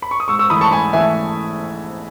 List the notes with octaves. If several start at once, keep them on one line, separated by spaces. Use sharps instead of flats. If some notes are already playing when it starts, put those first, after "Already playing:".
B5
C#6
D#6
G#2 C#6 E6
C#6 E6
E3 A3 B5 D#6
A5 C#6
G#2 G#5 B5
E3 A3 E5 G#5